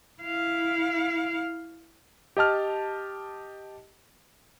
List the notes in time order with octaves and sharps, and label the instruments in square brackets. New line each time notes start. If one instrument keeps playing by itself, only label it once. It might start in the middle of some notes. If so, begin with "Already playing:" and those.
[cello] E4 F5
[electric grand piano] G4 D#5 A5 F6